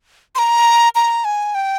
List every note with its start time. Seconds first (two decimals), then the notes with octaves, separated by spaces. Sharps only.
0.35 C6
0.39 A#5
0.95 A#5
1.25 G#5
1.55 G5